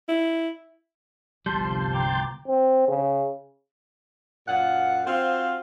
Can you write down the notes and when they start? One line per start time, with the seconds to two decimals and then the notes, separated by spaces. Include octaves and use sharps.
0.09 E4
1.46 G1 C2 F3 G3 A5 C6 G6
1.94 G5 A#5 D6
2.48 C4
2.88 C#3
4.48 F#2 A#2 F5 F#5
5.06 C4 F4 F#4 C5 F5